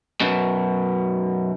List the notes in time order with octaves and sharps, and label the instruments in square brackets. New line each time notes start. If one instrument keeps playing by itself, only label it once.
[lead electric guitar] F#2 B2